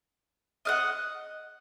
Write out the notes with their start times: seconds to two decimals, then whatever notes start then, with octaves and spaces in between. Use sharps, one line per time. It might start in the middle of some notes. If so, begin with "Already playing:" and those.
0.65 D#5 F5 F#5